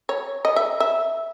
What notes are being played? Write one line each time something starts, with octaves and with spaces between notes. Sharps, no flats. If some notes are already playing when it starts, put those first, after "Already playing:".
C#5
D#5
E5
E5